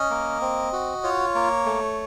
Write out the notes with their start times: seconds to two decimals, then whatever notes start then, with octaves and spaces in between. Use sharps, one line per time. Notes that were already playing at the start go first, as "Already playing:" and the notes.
Already playing: C#4 D#5
0.10 A#3
0.41 C4
0.73 F#4
1.04 F4 C#5
1.35 A#3
1.65 A3